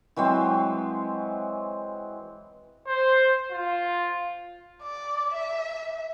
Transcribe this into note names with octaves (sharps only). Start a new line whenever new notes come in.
E3 F#3 G#3 C4
C5
F4
D5
E5